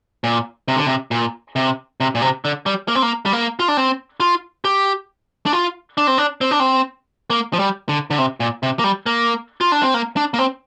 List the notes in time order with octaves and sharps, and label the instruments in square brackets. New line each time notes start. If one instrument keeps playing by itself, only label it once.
[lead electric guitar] A#2
C3
D3
C3
A#2
C3
C3
A#2
C3
D3
G3
A#3
C4
A#3
G3
A#3
F4
D4
C4
F4
G4
D4
F4
D4
C4
D4
C4
D4
C4
A#3
F3
G3
D3
D3
C3
A#2
C3
A#3
G3
A#3
F4
D4
C4
A#3
D4
A#3
C4